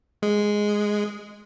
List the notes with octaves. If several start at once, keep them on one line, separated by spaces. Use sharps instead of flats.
G#3